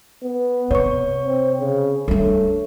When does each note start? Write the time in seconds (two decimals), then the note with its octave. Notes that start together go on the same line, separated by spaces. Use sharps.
0.24 B3
0.71 C3 C#5 C#6
1.25 C4
1.60 C#3
2.08 G3 A3 D4